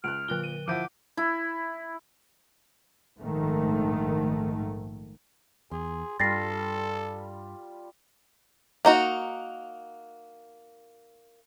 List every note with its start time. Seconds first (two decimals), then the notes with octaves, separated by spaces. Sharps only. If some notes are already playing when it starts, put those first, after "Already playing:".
0.04 C#2 F6 F#6 D7
0.28 A#2 D3 F#6 G7
0.44 D#7
0.68 F3 E4 F#5 D6 G6 D#7
1.17 E4
3.20 A#1 G#2 D#3 A3
5.71 E2 G#4 C6
6.20 G2 G3 F4 A4 A6 A#6 C7
8.85 A#3 D#4 F#4